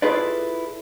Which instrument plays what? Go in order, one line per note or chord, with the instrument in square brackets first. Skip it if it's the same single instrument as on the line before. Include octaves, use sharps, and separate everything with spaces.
[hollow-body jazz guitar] E4 F4 G#4 A4 B4 D5